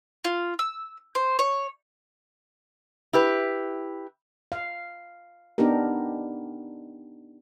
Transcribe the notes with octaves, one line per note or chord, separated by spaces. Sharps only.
F4
E6
C5
C#5
E4 G4 B4
F5
B3 D4 D#4 G4 A#4